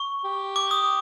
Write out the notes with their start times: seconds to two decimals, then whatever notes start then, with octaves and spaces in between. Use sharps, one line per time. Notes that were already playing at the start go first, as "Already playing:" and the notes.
Already playing: C#6
0.24 G4
0.56 D6
0.71 D#6